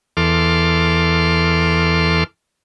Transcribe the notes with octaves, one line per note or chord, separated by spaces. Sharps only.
E2 A4 C6 D6 F6